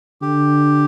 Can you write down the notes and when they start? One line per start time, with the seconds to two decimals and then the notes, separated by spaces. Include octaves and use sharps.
0.22 D3 G4